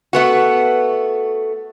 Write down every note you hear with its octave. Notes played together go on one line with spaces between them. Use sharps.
A3 B3 F#4